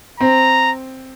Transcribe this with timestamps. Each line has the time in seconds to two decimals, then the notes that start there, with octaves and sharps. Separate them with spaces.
0.20 C4 A#5